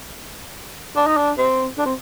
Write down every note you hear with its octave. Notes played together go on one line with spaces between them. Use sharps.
D4
D#4
D4
C4
D4
C4